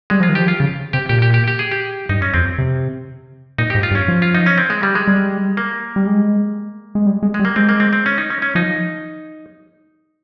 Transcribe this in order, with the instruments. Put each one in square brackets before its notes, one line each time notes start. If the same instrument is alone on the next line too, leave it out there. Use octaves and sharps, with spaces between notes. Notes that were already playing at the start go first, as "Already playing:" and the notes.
[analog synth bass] G3 [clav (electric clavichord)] G#3
[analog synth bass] F3 [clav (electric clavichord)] F4
[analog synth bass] D#3
[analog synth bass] F3 [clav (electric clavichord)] G4
[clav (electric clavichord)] F4
[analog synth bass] C#3
[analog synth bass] C3 [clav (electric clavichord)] G4
[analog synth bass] A#2 [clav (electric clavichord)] G4
[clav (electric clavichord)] G4
G4
G4
G#4
G4
[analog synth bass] G2 [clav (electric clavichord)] D#4
[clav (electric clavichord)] C#4
[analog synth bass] F2 [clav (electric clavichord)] C4
[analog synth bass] C3
[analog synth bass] A#2 [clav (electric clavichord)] D#4
[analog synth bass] G#2 [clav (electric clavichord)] G4
[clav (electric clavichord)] F4
[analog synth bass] G2
[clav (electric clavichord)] C#4
[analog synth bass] F3
[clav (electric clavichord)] F4
D#4
C#4
C4
G#3
G3
G#3
[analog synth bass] G3
[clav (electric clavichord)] A#3
[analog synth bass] G3
G#3
G#3
G3
G#3
[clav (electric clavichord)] G#3
[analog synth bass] G3
[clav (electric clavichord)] A#3
[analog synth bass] G#3 [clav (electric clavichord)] C4
[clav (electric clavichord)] A#3
C4
C4
C#4
D#4
C#4
C#4
[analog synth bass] F3 [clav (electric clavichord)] D#4